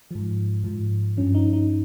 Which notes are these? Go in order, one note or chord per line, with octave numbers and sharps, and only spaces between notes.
G#2 F3
G#2 F3
G2 F3 C#4
D#4
D#4